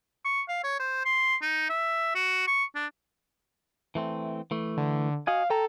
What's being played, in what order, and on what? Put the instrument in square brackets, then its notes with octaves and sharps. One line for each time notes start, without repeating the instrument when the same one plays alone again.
[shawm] C#6
F5
C#5
C5
C6
D#4
E5
F#4
C#6
D4
[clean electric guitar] E3 A3 C4
E3 A3
[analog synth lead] D3
[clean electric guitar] F#4 D#5 G#5 [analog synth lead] F5
[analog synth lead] A4 [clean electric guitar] G5 A#5